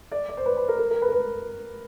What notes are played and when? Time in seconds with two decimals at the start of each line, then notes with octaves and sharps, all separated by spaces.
0.12 D5
0.29 D5
0.37 C5
0.46 B4
0.57 B4
0.68 A#4
0.79 A#4
0.90 A#4
1.02 B4
1.08 A#4
1.12 B4